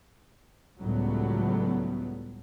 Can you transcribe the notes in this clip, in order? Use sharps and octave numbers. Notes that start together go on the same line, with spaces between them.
C#2 A2 F#3 G3 A3 B3